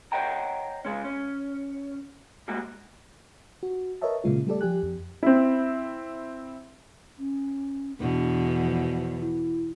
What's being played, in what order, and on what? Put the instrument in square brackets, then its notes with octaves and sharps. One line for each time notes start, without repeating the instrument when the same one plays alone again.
[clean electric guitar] C5 C#5 D#5 F#5 G5 A#5
C#2 C#3 G#3 C#4
C#4
G3 G#3 A#3 F#4
[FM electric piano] F#4
A#4 B4 C#5 D#5 E5 A5
A#2 C#3 G#3 F4
G3 A3 G4 A4 D5
F3 G4 G#5 F#6
F2
[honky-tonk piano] C4 E4
[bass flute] C#4
[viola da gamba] E2 B2 [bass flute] D4
[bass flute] F3
E4